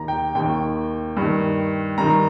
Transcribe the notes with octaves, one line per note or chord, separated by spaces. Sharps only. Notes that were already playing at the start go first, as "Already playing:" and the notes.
Already playing: D#2 D#3 A#5
G5
D#2 D#3 G5
G2 D#3
G2 D#3 A#5